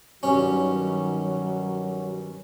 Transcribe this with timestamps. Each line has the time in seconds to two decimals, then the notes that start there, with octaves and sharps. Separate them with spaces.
0.23 G2 D#3 F#3 C#4